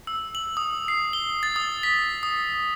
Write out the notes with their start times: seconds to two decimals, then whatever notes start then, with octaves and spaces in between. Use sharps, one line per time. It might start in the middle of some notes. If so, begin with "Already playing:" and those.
0.07 E6
0.35 F#7
0.57 D#6
0.88 C7
1.13 G7
1.43 A6
1.56 D#6
1.83 B6
2.23 D#6